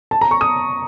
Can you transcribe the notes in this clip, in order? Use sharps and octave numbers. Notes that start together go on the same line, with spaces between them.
A5
A#5
C#6
D#6